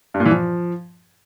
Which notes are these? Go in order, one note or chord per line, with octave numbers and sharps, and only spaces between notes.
G2
A#2
E3
F3